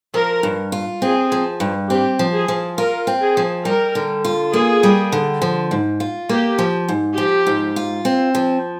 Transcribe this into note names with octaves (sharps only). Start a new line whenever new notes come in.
F3 A#4
G2
F4
C4 G#4
F3
G2
C4 G4
F3
G#4
F3
F4 A#4
C4
G#4
F3
G3 A#4
D3
F4
A#3 G#4
G3
D3
F3
G#2
F4
A#3 G4
F3
G#2
F3 G4
G#2
F4
C4
F3